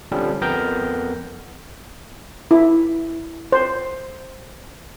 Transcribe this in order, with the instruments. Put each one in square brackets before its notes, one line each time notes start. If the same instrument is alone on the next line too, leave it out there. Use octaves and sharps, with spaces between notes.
[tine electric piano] D3 F3 G3 C4 C#4
F2 B3 A#4 G5 A#5 G6
[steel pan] E4
C5